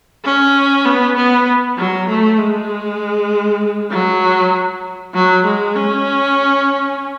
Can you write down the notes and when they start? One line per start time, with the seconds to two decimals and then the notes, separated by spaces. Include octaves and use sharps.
0.25 C#4
0.85 B3
1.16 B3
1.77 F#3
2.08 A3
2.39 G#3
3.91 F#3
5.14 F#3
5.44 G#3
5.76 C#4